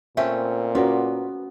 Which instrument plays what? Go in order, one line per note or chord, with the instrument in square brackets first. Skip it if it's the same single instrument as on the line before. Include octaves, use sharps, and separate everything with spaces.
[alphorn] A#2 [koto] A3 C4 C#4 [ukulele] E5
[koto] B3 [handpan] C#4 F#4 [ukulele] F4 A#4 D5